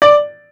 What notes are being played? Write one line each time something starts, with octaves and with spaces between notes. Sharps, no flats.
D5